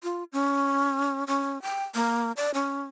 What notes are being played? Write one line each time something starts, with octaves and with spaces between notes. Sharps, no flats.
F4
C#4
C#4
G5
A#3
D5
C#4